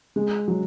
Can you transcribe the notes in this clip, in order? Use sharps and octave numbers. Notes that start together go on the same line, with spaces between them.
G#3
F#3